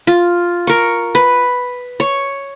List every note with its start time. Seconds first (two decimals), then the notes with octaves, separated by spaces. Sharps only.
0.07 F4
0.67 A#4 C#6
1.15 B4
2.00 C#5